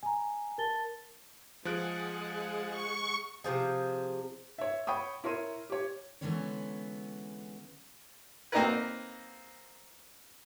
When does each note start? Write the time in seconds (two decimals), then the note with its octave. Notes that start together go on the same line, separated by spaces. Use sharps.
0.03 G#5 A#5
0.58 A#4 A5 A6 G7
1.65 F3 G#3 G#4 F#5 F#6 D7
2.68 C#6
3.44 C3 F3 G#4
4.58 C#5 E5
4.87 C#5 G5 B5 C#6 D#6
5.24 E4 A#4 C#5 C6 D#7
5.70 G4 C#5
6.21 D3 E3 G#3 B3 C#4 C#5
8.52 A#3 C4 D#4 F#4 A#4 B4